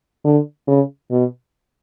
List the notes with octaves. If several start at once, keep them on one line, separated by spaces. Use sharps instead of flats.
D3
C#3
B2